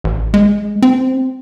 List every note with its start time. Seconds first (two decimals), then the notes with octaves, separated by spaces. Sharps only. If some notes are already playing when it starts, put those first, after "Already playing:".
0.04 A1
0.34 G#3
0.82 C4